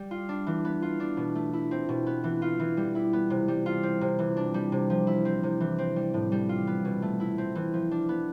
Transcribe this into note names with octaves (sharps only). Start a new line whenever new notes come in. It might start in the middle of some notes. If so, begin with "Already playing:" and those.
Already playing: G3
F4
D4
E3
B3
F4
D4
B2
A3
E4
C4
B2
B3
E3
F4
E3
G3
E4
B3
C3
G3
F4
C4
C3
E3
D4
G3
C3
F3
E4
C4
C3
E3
C4
G3
A2
G3
F4
B3
B2
A3
E4
C4
E3
F3
D4
B3